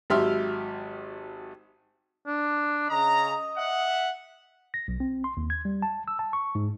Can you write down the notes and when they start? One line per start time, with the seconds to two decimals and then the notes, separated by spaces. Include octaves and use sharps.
0.10 G#1 F#3 G4 E5 C6 F6
2.27 D4
2.90 C#3 C#4 D#5 A#5
3.56 E5 F#5
4.74 A#6
4.88 B1
5.00 C4
5.24 C6
5.37 D#2
5.50 G#6
5.65 G3
5.82 A5
6.08 E6
6.19 A5
6.33 C#6
6.55 G#2